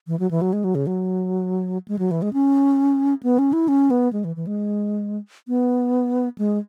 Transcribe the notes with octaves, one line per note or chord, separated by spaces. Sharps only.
E3
F#3
E3
F#3
G#3
F#3
C#3
F#3
G#3
F#3
E3
G#3
C#4
B3
C#4
E4
C#4
B3
G#3
E3
E3
G#3
B3
G#3